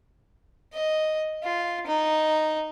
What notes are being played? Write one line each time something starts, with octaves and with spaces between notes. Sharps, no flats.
D#5
F4
D#4